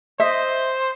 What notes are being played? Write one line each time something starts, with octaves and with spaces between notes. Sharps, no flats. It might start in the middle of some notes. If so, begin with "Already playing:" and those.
C5 D#5 E5